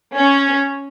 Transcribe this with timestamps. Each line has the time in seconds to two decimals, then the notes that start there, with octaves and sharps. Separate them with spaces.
0.16 C#4